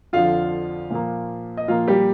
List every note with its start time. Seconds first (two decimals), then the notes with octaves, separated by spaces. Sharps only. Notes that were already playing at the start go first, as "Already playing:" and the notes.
0.13 F2 D3 F3 F4 F5
0.91 A#2 F3 A#3
1.57 D#5
1.68 A#2 F3 A#3 F4 F5
1.88 G3 G4